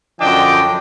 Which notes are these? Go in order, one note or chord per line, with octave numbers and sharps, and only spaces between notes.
F#2 D3 F3 D4 D#5 G5